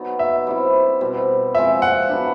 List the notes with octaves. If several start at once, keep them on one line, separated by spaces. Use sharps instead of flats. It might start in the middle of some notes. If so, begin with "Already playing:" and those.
Already playing: F#3 B3 D#4
E5
G3 C4 E4
B2 G3 C4
F3 G#3 C4 E5
F#5
F#3 B3 D4